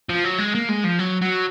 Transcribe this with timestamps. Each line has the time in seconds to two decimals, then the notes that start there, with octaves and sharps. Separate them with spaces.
0.09 F3
0.25 F#3
0.39 G#3
0.55 A#3
0.69 G#3
0.84 F3
0.99 F#3
1.22 F#3